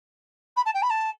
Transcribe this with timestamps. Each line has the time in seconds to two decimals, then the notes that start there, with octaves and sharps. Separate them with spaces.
0.57 B5
0.66 A5
0.74 G5
0.83 B5
0.90 A5